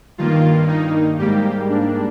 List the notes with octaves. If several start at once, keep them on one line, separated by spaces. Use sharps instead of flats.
G2 D#3 A#3 F4
D#4
G#2 G3 A#3 G4
D4